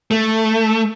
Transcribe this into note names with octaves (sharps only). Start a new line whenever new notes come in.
A3